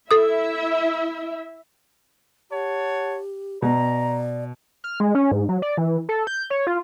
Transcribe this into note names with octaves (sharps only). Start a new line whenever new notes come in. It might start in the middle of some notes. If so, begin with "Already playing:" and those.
E4 A4 E5 D#6
G4 C#5 F#5 A5
B2 D5 A#5
F6
G#3
C#4
G#2
F#3
D5
E3
A4
G6
C#5
F4